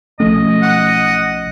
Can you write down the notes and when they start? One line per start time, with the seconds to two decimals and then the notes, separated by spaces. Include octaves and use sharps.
0.20 B1 F3 A3 C#4 D#5
0.62 F#5